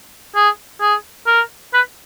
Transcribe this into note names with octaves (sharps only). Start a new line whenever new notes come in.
G#4
G#4
A#4
B4